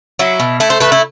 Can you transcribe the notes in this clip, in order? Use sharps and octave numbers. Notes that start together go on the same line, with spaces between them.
F#3 E4
B2
A3 E4
C5
A3 B4
E4